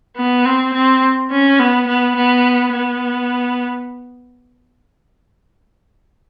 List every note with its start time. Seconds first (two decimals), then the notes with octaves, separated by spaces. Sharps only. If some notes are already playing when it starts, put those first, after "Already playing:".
0.16 B3
0.45 C4
0.74 C4
1.31 C#4
1.59 B3
1.88 B3
2.16 B3
2.73 B3